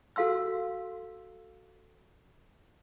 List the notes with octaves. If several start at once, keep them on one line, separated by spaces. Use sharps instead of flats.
F#4 A4 F5 C6 E6